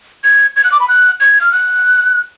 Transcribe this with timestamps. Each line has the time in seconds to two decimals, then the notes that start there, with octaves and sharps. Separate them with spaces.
0.24 G#6
0.56 G#6
0.64 F#6
0.72 D6
0.80 B5
0.89 F#6
1.20 G#6
1.41 F6
1.52 F#6